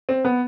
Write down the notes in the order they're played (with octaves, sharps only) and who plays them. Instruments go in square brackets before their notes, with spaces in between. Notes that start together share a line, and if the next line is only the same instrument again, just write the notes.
[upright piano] C4
B3